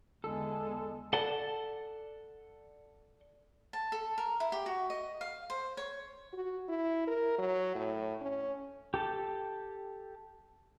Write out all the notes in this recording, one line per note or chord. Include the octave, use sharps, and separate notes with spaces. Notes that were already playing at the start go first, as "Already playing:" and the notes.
E2 D3 G#3 B3 E4 A4 G#5
A4 D5 F#5 A5
A5
A4
A#4
E4
G4
F#4
D#5
F5
C5
C#5
F#4
E4
A#4
F#3
A2
C#4
G4 A4 A5